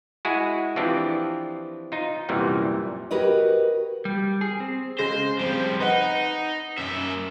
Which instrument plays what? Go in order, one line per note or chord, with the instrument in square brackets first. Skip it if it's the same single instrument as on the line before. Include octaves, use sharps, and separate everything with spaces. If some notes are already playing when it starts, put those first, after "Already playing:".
[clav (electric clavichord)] G#3 E4 F#4 G#4
E3 F3 C4 D4 F4 G4
D#4 F4
C2 F#2 A#2 E3 G3
[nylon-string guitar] F#4 G4 A#4 B4 C#5 D#5
[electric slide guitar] G3
G#4
C4
[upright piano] C#3 G#3 A#6 [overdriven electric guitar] C5
[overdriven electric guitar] F3 G3 [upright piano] C4 C5
[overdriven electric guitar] D#4 [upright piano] B4 D#5 F#5
[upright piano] F#2 [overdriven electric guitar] A#3 E5